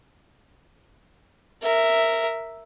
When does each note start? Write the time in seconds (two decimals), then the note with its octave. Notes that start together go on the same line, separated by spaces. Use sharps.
1.62 A#4 E5